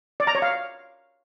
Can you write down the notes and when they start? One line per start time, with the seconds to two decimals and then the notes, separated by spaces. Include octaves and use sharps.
0.20 D5
0.27 A#5
0.35 C#5
0.42 F5